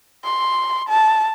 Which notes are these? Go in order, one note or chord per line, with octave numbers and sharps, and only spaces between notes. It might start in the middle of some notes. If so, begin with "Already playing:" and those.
C6
A5